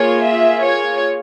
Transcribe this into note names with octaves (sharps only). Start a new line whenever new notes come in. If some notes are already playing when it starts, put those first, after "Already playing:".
Already playing: A#3 F4 G#4 C#5
E5
C#5